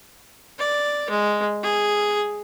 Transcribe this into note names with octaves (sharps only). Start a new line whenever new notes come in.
D5
G#3
G#4